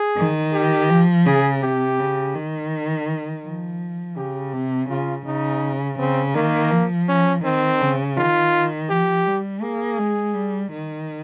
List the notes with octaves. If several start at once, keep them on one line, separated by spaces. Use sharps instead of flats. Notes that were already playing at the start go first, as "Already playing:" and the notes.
Already playing: G#4
D#3
G4
F3
C#3 G#4
C3 G4
C#3
D#3
F3
C#3 G4
C3
C#3 F4
C#3 D#4
C#3 C4
D#3 A#3
F3
C#4
D#3 C4
C#3
D#3 F4
F3 G4
G3
A#3 G#4
G#3
G3
D#3